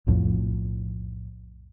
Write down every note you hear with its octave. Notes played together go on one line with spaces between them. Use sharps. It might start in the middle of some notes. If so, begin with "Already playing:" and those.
B1 F2 A2 F3